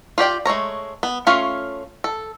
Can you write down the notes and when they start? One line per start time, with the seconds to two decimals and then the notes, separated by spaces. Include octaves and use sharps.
0.18 F4 G4 D5 G5
0.46 G#3 A3 C#5 A#5
1.03 B3
1.27 A3 C#4 F4 C#5 F5
2.04 A4